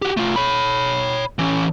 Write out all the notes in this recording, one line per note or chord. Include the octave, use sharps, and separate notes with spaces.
F#4 G4
A3 F4
C#5 B5
E3 C#4